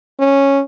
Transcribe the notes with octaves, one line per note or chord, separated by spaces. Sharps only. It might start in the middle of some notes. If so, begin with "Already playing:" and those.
C#4